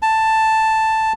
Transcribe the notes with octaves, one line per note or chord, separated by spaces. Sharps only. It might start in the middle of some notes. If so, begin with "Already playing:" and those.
A5